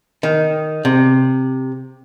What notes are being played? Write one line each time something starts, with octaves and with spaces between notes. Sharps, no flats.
D#3
C3